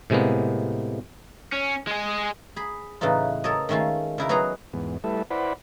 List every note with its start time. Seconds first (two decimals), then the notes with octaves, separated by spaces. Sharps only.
0.10 A2 C3 G#3 A#3 B3
1.52 C#4
1.87 G#3 G#4
2.56 G#4 B5
3.01 A2 C#3 E3 D#4 F4
3.44 A4 A#4 C#5 D#5
3.69 D#3 G#3 A3 C#4 F4
4.18 C#3 E4 A#4
4.29 F#3 B3 D#4 G#4 A#5
4.74 E2 G#2 B3
5.04 G3 A3 E4 A4 B4 E5
5.31 E4 B4 C5 D5 F#5 B5